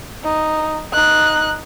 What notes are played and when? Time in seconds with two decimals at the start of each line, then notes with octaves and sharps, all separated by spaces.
0.24 D#4
0.93 D#4 F#6